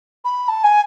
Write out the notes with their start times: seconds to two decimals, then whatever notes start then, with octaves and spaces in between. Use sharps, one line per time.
0.25 B5
0.48 A5
0.64 G#5